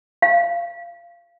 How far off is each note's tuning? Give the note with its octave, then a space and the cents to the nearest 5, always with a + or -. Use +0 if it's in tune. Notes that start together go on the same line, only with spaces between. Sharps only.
F5 -20